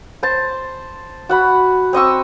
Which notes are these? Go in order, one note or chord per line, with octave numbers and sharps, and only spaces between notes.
C5 A5
F#4 F#5 B5
C4 D#5 C#6 E6